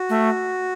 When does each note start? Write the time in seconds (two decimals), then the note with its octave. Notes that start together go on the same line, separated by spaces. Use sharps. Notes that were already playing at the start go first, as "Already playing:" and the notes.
Already playing: F#4
0.09 A3